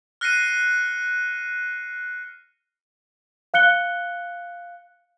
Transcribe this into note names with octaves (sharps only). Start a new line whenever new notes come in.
F6 F#6 A#6 C7 C#7 D#7
F5 F#6 C#7 G7